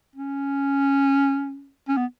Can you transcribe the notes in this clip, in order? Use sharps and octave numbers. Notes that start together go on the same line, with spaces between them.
C#4
C#4
B3